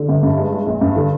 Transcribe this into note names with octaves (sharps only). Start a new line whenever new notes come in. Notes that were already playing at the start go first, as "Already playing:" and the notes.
Already playing: D3
G1
G2
G#3
G#3
A#1
G2
D3